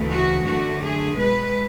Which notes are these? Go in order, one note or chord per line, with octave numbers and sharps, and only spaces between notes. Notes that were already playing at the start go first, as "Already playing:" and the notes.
Already playing: D2 C#3 E3 A3
F#4
F#2 D3 A3 F#4
G#4
B2 G#3 B4